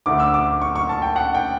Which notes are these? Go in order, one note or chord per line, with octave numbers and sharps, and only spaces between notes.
D2 D3 A3 D6
E6
D6
C#6
C#6
A5
G5
F#5
G5